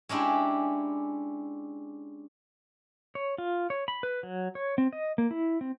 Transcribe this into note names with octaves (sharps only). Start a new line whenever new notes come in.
G#3 C#4 D4 E4 G4
C#5
F4
C#5
B5
B4
F#3
C#5
C4
D#5
A#3
E4
C4